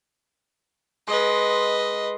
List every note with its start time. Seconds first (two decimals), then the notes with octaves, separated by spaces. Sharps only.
1.08 G#3 B4 D#5